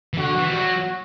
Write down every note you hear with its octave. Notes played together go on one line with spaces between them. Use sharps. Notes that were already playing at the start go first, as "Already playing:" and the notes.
E3
D3 F#4
E3
G3
F#3